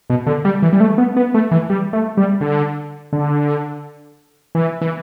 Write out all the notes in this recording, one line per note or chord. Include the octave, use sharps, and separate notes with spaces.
B2
D3
G3
E3
G3
A3
B3
B3
A3
E3
G3
A3
G3
D3
D3
E3
E3